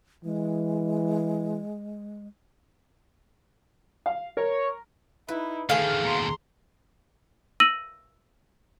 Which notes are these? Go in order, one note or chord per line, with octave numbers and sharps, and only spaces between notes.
E3 G#3
F5
A#4 C#5
D#4 E4 B4
D3 D#3 A3 G#4 F5 F6
D#2 B2 A#5 C6
E6 A#6 D#7 F#7